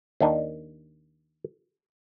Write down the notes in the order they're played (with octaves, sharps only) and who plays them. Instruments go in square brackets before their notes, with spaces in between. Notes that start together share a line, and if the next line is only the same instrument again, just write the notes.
[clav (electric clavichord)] D#2 D#3 D4 D#4